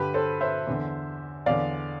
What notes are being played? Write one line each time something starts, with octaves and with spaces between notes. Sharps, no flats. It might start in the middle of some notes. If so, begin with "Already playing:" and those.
Already playing: G2 D3 G4 B4
A4 C5
C5 E5
E2 D3
E2 D3 D5 F5